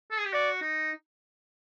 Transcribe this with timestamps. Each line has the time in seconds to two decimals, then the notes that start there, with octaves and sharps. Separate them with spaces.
0.11 A4
0.19 G#4
0.25 G4
0.33 F#4 D5
0.62 D#4